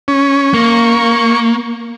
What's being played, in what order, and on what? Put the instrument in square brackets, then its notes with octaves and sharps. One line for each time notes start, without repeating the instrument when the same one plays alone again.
[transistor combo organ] C#4
[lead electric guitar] A#3 [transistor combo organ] C#6